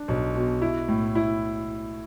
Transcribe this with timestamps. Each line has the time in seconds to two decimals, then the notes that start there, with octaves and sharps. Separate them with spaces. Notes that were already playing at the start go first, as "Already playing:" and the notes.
Already playing: D4
0.08 B1
0.35 B2
0.62 E4
0.88 A2
1.15 E4